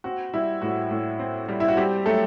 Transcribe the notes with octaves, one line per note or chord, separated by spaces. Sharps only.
C4 F#4
G3 E4
A2 F#4
A2
C4
G3
E4
F#4
G3 C4 G4
F#3 A3 A4